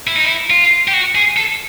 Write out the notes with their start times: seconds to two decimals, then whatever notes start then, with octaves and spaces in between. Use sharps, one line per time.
0.07 E4
0.16 D#4
0.24 E4
0.50 F4
0.88 G4
0.93 F#4
1.15 G#4
1.37 A4